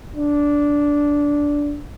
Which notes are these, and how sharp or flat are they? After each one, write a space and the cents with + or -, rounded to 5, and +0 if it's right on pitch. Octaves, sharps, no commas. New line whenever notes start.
D4 -10